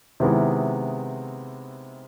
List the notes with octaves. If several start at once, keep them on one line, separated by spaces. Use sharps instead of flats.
C3 D#3 G#3 B3 E4